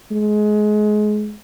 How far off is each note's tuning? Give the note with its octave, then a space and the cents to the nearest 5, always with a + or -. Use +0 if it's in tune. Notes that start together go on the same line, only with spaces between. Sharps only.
G#3 +25